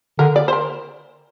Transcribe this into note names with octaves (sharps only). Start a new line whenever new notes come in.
D3 A#4
D5
C5
A#4